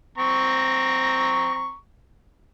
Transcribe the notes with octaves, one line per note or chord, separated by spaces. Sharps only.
C4 A#5 C#6